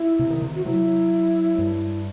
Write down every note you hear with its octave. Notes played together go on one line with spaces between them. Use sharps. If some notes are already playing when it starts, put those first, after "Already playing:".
Already playing: E4
C3
D#3
C3
F#4
F#3 E4
G2